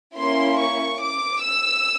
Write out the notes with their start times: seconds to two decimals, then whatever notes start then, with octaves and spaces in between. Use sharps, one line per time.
0.17 A#3 C#4 E4 C6
0.60 C#6
1.02 D6
1.45 E6